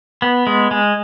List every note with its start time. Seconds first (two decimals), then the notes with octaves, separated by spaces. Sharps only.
0.22 B3
0.47 G#3
0.71 G#3